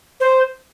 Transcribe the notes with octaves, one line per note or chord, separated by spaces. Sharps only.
C5